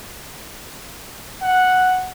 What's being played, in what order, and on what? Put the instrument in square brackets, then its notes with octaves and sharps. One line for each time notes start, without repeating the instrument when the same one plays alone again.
[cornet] F#5